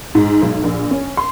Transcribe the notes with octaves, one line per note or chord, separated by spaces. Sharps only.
G#2
B1
A#1
C#4
C6